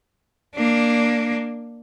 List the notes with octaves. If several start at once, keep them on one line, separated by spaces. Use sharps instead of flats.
A#3 D4